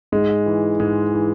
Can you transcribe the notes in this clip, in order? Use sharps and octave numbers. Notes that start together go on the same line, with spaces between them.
G#2 G#3
E3
G#2 G#3
E3